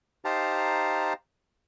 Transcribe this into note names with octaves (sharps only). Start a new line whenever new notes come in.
D#4 G4 C5 F5 A5 A#5